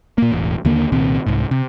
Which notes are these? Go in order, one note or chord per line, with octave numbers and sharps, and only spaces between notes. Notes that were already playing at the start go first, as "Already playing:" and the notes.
A#2 A#3
E1 A1
D#2 D3 A#3
C2 A#2 D#3 C4
C2 G#2
C3